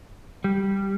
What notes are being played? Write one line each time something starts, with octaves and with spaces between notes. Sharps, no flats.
G3